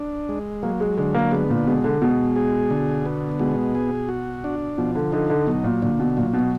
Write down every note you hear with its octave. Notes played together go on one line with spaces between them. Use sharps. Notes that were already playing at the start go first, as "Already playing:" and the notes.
Already playing: D4
G#3
F#3 A#3
G#3
D3 G#3
A#3
G#3 B3
A#2
B2 G#3
D3
B2 G#3
G#4
D3
B3
B2 G#3
G#4
F#4
D4
B2 F3
D3
D3 D#4
D3
B2 F#3
A#2
A#2 D3
B2
A#2 F#3
B2